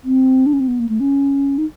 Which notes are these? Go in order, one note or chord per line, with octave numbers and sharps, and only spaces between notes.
C4
D4
C#4
C4
B3
A#3
A3
C#4
D#4